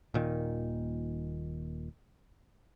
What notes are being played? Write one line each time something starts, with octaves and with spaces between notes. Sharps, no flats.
D#1 A#2 D#3